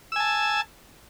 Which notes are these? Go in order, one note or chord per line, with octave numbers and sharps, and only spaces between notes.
G#5 A5 E6